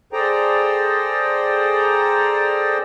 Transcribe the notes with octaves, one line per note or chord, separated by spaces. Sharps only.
G#4 A4 C5 D5 G5 A#5